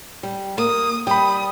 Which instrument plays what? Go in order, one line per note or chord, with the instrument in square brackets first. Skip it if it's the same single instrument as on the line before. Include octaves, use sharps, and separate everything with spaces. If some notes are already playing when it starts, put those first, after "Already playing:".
[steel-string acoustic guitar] G3
[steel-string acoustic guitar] A#3 [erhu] D#6
[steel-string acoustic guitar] G3 [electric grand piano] G5 B5 [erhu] D#6